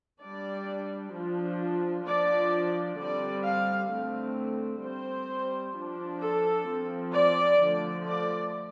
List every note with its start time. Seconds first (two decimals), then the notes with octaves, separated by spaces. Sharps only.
0.21 G3 D4 D5
1.13 F3 D4
2.05 F3 D4 D5
2.98 D3 G3 C4 D5
3.44 F5
3.90 D3 A3 C4
4.82 G3 C4 C5
5.75 F3 D4
6.21 A4
6.68 F3 C4
7.13 D5
7.60 D3 F3 A3
8.06 D5